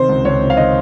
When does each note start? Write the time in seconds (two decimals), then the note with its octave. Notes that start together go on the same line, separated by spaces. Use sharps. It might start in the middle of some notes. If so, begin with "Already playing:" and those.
Already playing: C3 D#3 C5
0.09 C#2
0.25 C#2 C#5
0.41 C3
0.50 F5
0.57 D#3 D#5